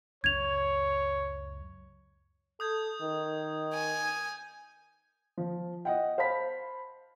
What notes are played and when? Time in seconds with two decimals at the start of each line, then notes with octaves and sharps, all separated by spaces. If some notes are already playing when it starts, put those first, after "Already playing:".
0.24 C#2 F#2 C#5 G#6 F7
2.60 A4 D#6 G6 G#6
3.02 D#3
3.74 G#5
5.38 F3
5.85 D#5 F#5 G5
6.18 C5 F5 A5 B5 B6